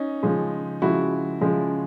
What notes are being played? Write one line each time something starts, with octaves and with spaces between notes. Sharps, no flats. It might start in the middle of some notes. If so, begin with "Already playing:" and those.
Already playing: C#4 D#4
C#3 F3 G#3
C#3 F3 G#3 E4 F#4
C#3 F3 G#3